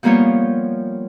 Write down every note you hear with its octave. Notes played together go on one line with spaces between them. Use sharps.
F3 G3 A#3 B3 F4 C#5